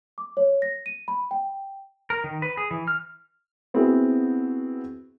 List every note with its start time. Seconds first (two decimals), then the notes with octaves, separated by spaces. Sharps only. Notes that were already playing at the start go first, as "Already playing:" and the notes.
0.18 D6
0.37 C#5
0.62 A#6
0.86 D#7
1.08 B5
1.31 G5
2.10 A#4
2.24 D#3
2.42 B4
2.57 G#4
2.71 E3
2.88 F6
3.74 B3 C4 E4 F#4 G#4